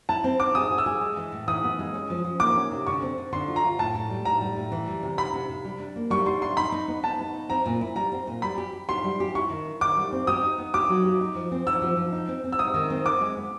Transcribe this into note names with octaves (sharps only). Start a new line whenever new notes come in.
E4 A5
C4
E4 D6
G#4 D#6
G#4
E6
G#4
G#3
E3
A2
E3 D#6
B3
G#3
C#4
F3
F3
A#3 D6
C#4
C3
D3 C#6
C4
D3
D3 C6
F4
A#5
F4
A2 A5
A2
G3
A2 A#5
G3
A2
E3
G3
C3
C3 B5
C3
C3
G3
D4
A#3
G3 C#6
G3 C6
D4 C6
D#4 B5
D#4
B3
D#4 A5
B3
D#4
C4 A#5
A#2
E4
G3 A#5
C4
A#2
G3 B5
G4
G4
G4 C6
G3
G4
E4 C#6
D#3
E4
D#3 D6
G3
C4
G4 D#6
D#4
B3
G4 D6
F#3
G4
D#4
F3
C4
F3 E6
F3
F3
D#4
C4
C4
E6
G#3 D#6
D#3
C4
B3 D6
G#3
B3